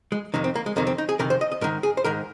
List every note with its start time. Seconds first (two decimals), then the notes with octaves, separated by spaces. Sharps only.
0.12 G#3
0.34 F2 C3 D#3 A#3
0.44 C4
0.55 A#3
0.66 G#3
0.76 F2 C3 D#3 A#3
0.87 C4
0.98 D#4
1.09 G#4
1.19 F2 C3 D#3 A#4
1.30 C5
1.41 D#5
1.52 D#5
1.61 G#2 D#3 A#4
1.83 G#4
1.97 C5
2.04 G#2 D#3 A#4